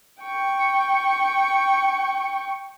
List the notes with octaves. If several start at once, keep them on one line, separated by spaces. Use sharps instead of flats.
G5 C#6